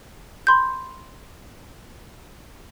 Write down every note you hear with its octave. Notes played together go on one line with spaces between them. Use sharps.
B5 C6 G6